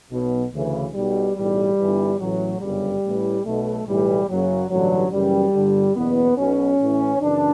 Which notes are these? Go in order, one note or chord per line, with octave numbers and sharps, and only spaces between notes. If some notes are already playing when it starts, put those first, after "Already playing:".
B1 B2
D2 C#3 E3
B1 B2 G3
B1 A2 E3 G3
G1 G2 E3
A1 A2 E3 F#3
G1 F#2 C#3 G3
A1 A2 E3
B1 B2 A3
B1 A2 E3 G3
F#1 F#2 C#3 F#3
A1 G2 D3 F#3
F#1 F#2 C#3 E3 G3
G1 G2 D3
F#1 E2 B2 B3
B1 B2 C#4
A1 A2 E3
F#1 F#2 C#3 E3 D4